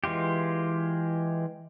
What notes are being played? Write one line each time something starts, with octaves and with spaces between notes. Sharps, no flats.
E3 G#3 F4 G4